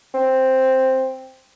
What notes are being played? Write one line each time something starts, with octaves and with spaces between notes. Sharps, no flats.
C4